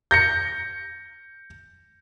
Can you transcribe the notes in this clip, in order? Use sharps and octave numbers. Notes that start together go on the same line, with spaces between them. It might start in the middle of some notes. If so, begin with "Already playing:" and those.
G6 A#6 C#7